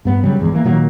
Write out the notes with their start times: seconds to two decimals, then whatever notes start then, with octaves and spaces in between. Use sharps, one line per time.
0.05 G2 B3
0.23 C#3 F#3 G3
0.39 G#1 E2 G#3
0.52 E3 A#3
0.65 A#2 D#3 F#3 A#3